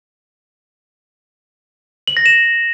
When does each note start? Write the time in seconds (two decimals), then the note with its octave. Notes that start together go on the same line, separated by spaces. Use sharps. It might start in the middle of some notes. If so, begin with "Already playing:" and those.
2.07 F#7
2.17 A#6
2.26 E7